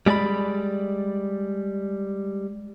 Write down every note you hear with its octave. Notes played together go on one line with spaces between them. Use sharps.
G3 G#3 D5 G#5 B5